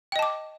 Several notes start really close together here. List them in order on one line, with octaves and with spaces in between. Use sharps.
G5 D#5 A5 D6